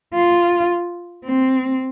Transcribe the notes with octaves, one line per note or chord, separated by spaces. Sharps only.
F4
C4